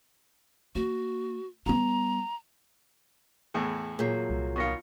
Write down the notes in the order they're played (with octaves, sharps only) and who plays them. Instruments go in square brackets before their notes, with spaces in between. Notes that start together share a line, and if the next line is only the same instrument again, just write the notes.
[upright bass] A#3 [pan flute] F#4
[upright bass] G3 B3 [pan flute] A#5
[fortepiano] E2 A2 E3 [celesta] G#4 A5
[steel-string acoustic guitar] A#2 F#3 [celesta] G#4 G6 C7
[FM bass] C2
[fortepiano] B2 D#3 F4 [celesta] C#6 A#6 C#7